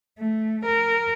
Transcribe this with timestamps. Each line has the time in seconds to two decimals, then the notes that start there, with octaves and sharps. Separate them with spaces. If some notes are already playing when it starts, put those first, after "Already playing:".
0.19 A3
0.65 A#4